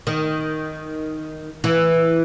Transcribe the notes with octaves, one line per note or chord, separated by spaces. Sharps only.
D#3
E3